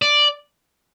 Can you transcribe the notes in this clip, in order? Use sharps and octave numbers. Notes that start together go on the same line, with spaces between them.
D5